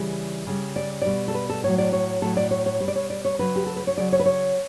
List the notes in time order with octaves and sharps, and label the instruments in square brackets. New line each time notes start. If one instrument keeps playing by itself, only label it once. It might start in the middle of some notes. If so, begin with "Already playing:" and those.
Already playing: [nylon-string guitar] C#3 E3 G3
C#3 G3
D5
B2 G3 D5
A4
B4
A4
A2 F#3 C#5
D5
C#5
A2 F#3 A4
D5
C#5
C#5
G3 C#5
B2 D5
C#5
D5
C#5
C#3 F#3 B4
G4
A4
B4
C#5
C#3 F#3 D5
C#5
B4
C#5